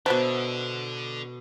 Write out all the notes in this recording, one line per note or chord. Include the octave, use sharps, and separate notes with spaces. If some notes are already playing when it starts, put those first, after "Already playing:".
B2 D3 F#3 B3 D4 C5 E5